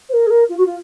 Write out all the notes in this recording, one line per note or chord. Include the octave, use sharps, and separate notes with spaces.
C5
A#4
G#4
A#4
F4
F#4
F4